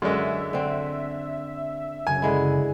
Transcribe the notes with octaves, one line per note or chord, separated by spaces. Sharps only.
F#2 D3 G#3 E5
D3 C4
F#2 C#3 G#5
D3 G#3 E4